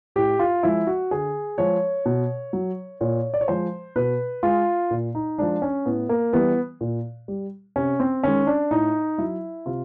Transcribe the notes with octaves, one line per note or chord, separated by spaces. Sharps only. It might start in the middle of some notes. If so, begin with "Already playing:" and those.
A2 G4
F4
F3 G#3 E4
F#4
D3 G#4
F3 G#3 C#5
B2
F#3
A#2 C#5
D5
C#5
F3 G#3 C5
B2 B4
G#3 F4
A#2
D#4
F3 G#3 D4
C#4
A2 B3
A#3
E3 G3 B3
A#2
G3
C3 C#4
C4
D#3 G#3 C#4
D4
A2 D#4
F#3 E4
C3 F4